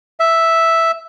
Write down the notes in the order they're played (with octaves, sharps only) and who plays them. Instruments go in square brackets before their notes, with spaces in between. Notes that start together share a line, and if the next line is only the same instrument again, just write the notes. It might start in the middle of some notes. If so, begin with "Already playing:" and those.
[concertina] E5